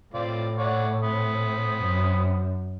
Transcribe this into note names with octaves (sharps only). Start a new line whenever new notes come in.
A2 C4 F4 D5
C#5 D5 F#5
C4 B5 D#6
F#2